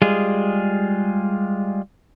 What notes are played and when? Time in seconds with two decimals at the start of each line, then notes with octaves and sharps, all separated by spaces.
0.02 G3 G#3 F4 G#4